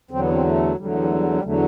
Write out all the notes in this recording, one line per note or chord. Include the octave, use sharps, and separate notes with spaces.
E2 D3 F#3 C4
B3
C4
A3
E2 D3 F#3 G3
A3
G3
A3
G3
A3
G3
E2 D3 F#3 A3